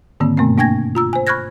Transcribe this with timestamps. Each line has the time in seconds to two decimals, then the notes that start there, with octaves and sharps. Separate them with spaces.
0.20 G#2 D3 D#3 A#3 C4
0.37 G2 B2 A3 B3 C4
0.58 A#3 D4 G5 G#5 G#6 A#6
0.95 F4 A#5 E6
1.13 C5 G#5
1.27 B5 C#6 F6 F#6 G#6 A#6